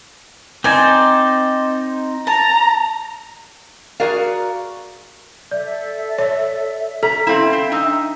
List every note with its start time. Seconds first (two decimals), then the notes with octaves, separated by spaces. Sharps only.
0.64 C4 D#4 C5 D5 G#5
2.27 A5 A#5
4.00 F#4 G#4 A#4 D5 F5
5.51 A4 D5 E5
6.18 C#5
7.03 A4 A#5 B6
7.27 C4 E4 E5 F5 E7
7.53 C4
7.72 D4 D#4 E6